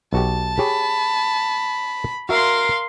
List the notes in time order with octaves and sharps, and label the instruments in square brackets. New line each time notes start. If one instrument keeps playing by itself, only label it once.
[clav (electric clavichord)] B1 F#4 G4 [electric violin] A5
[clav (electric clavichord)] G4 G#4 C#5 [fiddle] B5
[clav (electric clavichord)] F#4 E5 [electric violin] A#4 [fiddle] F5 C6